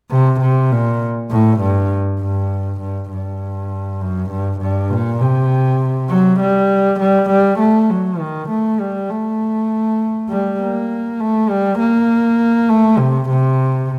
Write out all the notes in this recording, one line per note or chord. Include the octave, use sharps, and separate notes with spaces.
C3
C3
A#2
A2
G2
G2
G2
G2
F#2
G2
G2
A#2
C3
F#3
G3
G3
G3
A3
F#3
D#3
A3
G3
A3
G3
A#3
A3
G3
A#3
A3
C3
C3